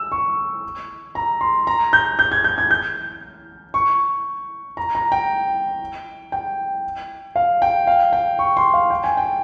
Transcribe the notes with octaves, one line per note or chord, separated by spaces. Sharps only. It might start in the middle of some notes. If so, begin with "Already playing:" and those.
Already playing: E6
C#6
A#5
C6
A#5
G6
G6
G#6
G6
G#6
G6
C#6
A#5
A#5
G5
G5
F5
G5
F5
G5
C#6
C6
F5
G5
G#5
G5